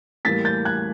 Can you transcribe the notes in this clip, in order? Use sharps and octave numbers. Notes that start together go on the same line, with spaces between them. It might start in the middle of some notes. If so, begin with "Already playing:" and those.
A2 E3 G3 A#3 A6 B6
G6 A6
F#6 G#6